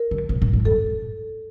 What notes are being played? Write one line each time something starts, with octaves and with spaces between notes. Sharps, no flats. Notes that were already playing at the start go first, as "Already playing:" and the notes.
Already playing: A#4
D3
C3
A#2
A2
G2 A4